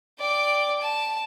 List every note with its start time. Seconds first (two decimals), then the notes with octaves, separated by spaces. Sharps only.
0.20 D5 G5
0.81 A5